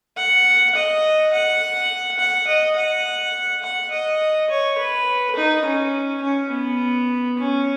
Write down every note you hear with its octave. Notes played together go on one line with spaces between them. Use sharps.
F#5
D#5
F#5
F#5
D#5
F#5
F#5
D#5
C#5
B4
D#4
C#4
C#4
B3
C#4